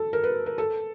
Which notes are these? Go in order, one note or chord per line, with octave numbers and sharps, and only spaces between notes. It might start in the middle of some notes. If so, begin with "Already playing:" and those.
Already playing: A4
A#4
B4
A#4
A4